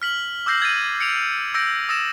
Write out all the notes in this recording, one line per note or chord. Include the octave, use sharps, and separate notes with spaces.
F6 B6 F#7
D6 E6 G6 A#6 C7 F#7
G#6 A6 D#7
C#7 D7 F7
E6 G6 A#6 D7
D#6 E6 A6 A#6 E7